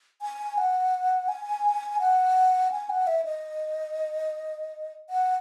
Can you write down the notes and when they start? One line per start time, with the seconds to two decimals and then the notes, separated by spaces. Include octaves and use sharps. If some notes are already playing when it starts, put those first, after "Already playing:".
0.22 G#5
0.58 F#5
1.28 G#5
2.00 F#5
2.72 G#5
2.90 F#5
3.07 E5
3.25 D#5
5.10 F#5